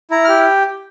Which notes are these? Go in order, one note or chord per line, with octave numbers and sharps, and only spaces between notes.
E4 A#5
G4 F6